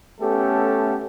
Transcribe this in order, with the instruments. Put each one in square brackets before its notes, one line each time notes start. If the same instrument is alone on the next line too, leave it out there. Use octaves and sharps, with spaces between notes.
[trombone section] A3 B3 C#4 G4 A4